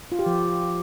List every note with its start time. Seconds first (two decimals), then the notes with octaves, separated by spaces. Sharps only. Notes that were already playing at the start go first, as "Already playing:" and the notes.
0.12 F4
0.19 G4
0.26 F3